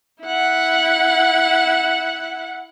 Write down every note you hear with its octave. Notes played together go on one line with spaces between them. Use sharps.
E4 F#5